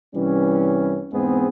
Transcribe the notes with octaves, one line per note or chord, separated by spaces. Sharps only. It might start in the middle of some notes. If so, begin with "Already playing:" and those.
C2 E3 G3 C#4
E2 G#2 G#3 B3 C4 G#4